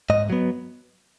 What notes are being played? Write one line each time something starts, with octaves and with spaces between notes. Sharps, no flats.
G#2 D#5
F#3 B3